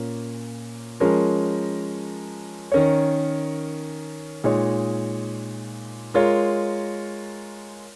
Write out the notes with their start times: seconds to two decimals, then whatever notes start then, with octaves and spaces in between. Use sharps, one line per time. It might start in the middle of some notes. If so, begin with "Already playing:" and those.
Already playing: A#2 A#3 C#4
1.00 F3 G#3 C#4 A#4
2.72 D#3 C#4 A#4 C#5
4.44 A#2 G#3 D#4 C#5
6.14 G#3 F4 A#4 C#5